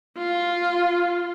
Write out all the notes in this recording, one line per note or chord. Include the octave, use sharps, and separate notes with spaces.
F4